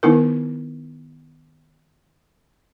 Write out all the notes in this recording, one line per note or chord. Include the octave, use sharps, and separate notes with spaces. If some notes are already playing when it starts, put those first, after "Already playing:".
D#3 B3 D#4 E4 A#4